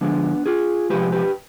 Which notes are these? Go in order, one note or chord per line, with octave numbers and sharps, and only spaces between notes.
D3 F3 G#3 B3 D4
F4 G#4
C3 F3 G#3 G4 B4
G4 B4